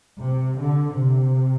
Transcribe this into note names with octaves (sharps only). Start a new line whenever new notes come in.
C3
D3
C3